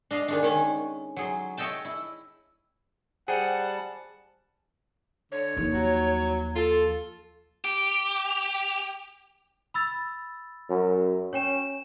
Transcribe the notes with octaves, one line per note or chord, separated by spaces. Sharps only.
D4 D#5 F5
D#3 G#3 D4
D#3 C#4
F#3 G#4 C6
C#5 D#5 E5 G5 A5
E4
G3 G#4 C5 F#5 G5 A5
D3 C#5
D#2 F3
F#3
F4 A4
G4
B5 E6 A6
F#2
C#4 C#5 G5 E7